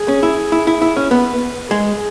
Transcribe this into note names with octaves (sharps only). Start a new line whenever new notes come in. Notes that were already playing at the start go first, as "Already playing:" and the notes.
Already playing: G#4
C#4
E4
E4
E4
E4
C#4
B3 B4
G#3 G#4